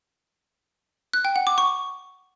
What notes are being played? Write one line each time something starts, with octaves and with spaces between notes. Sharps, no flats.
F#6
G5
F#5
D6
C#6